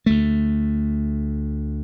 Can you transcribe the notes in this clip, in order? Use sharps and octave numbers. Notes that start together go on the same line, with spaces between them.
D2 A3